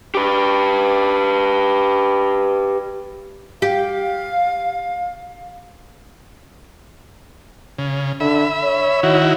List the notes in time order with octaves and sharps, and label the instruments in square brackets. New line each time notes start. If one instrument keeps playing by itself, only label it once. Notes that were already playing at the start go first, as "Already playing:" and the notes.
[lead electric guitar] G4 B4
[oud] G4 [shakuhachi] F5
[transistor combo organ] C#3
[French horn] D3 [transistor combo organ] E5 B5
[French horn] C#5
[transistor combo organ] D#3 E4 F#4